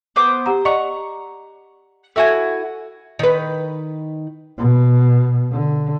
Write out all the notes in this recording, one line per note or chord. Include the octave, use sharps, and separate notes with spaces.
B3 C5 D6
G4 F#5 A#5
D5 D#5 F#5 A#5 C#6
E4 F#4 A4 E5 G#5
D#3 B4
B2
D3